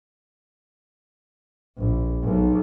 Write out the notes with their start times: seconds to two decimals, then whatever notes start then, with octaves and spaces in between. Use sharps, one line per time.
1.78 A#1
2.23 B1